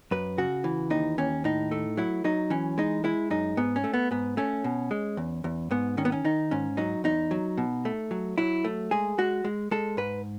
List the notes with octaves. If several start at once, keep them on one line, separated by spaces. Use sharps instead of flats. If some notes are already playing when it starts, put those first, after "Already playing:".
F#2 B4
C#3 F#4
E3
D#2 D#4
D#2 C#4
A2 D#4
A3
F#3 E4
F#3 D#4
E3 C#4
G#3 D#4
G#3 E4
F#2 D#4
G#2 B3
C#4
A3
B3
G#2 B3
A3 C#4
B2
G#3
E2
E2
G#2 B3
D#3 C#4
B3
C#4
D#3 D#4
G#2 C#4
F#3 D#4
E2 D#4
F#3
B2
A3
F#3
F#3 E4
A3
G#3 G#4
G#3 F#4
G#3
G#3 A4
G#2 B4